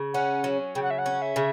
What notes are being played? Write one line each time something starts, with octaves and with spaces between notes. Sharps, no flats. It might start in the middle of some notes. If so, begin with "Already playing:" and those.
Already playing: C#3
C#4 F#5
F#3
C#3 G5
F#5
E5
F#5
C#4
E5
C#3